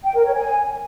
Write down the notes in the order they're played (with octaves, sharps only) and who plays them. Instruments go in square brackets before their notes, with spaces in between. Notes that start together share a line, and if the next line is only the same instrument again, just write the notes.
[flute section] G5
A#4
C#5
G#5